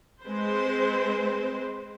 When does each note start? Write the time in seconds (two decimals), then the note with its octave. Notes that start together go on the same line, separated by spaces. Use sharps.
0.23 G#3 C4 B4 C5